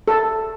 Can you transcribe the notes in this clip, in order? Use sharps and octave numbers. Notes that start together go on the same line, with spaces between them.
A4